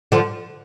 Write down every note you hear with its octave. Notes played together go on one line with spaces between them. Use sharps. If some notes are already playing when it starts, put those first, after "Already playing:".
D3 F3